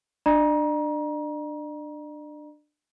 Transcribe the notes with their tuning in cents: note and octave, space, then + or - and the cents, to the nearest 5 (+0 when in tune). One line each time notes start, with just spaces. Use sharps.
D4 +20 D5 +45 A#5 +30